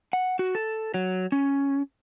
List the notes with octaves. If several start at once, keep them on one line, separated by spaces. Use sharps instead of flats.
F#5
F#4
A4
F#3
C#4